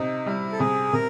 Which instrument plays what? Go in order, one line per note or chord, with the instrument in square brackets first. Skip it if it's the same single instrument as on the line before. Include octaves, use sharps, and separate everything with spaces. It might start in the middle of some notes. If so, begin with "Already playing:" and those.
Already playing: [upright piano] C3 [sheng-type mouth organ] D#4
[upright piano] G3 [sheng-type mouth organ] E4
[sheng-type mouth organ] A4
[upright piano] C3 [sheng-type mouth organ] G#4
[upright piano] C3 [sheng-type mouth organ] A#4